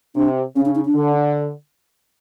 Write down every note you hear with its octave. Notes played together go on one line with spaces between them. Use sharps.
C3 D4
C#3 C#4
D4
D#4
D4
D3